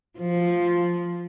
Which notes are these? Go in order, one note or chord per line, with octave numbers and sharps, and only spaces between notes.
F3